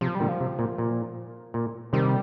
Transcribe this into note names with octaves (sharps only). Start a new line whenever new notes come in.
C3 F3
G3
A#2 D3
F3
C3
A#2
A#2
A#2
C3 D#3 G3